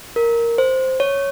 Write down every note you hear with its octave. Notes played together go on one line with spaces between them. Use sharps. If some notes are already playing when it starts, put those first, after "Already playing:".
A#4
C5
C#5